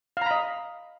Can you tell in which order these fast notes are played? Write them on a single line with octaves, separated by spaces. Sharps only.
F5 A#5 B5 D#5